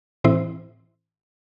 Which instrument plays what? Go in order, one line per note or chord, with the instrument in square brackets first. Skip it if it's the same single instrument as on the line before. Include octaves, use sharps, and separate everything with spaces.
[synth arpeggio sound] A2 E3 C4 E4 C5